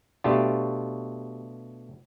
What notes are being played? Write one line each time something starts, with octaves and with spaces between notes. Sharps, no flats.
B2 A3 D4 F4 G4